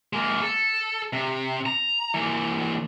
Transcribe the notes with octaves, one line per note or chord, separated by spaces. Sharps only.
G#3 A#3
A4
C3
A#5
E3 A#3